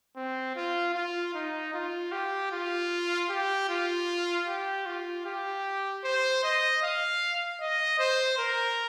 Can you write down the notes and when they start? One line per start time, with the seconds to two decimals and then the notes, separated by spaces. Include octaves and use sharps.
0.16 C4
0.56 F4
0.95 F4
1.34 D#4
1.74 F4
2.12 G4
2.52 F4
3.29 G4
3.69 F4
4.47 G4
4.86 F4
5.25 G4
6.04 C5
6.43 D#5
6.82 F5
7.60 D#5
7.99 C5
8.38 A#4